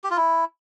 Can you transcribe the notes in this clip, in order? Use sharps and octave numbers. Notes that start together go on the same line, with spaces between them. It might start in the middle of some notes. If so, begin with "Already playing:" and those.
G4
F4
E4